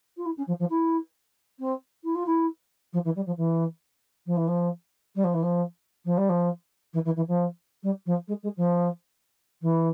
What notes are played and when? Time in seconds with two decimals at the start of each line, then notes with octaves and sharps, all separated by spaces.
0.17 F4
0.25 E4
0.37 C#4
0.47 F3
0.59 F3
0.69 E4
1.59 C4
2.03 E4
2.15 F4
2.26 E4
2.92 F3
3.04 E3
3.15 G3
3.26 F3
3.37 E3
4.26 F3
4.36 E3
4.47 F3
5.15 G3
5.23 F3
5.33 E3
5.42 F3
6.04 F3
6.17 G3
6.29 F3
6.93 E3
7.04 E3
7.15 E3
7.27 F3
7.82 G3
8.05 F3
8.27 G#3
8.42 G#3
8.56 F3
9.61 E3